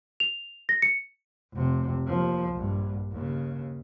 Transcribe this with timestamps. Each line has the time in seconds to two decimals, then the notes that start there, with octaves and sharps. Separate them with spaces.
0.20 F7
0.69 A#6
0.82 C#7
1.53 F1 C3
2.05 D#2 F3
2.53 A#1 G2
3.12 D#2 C#3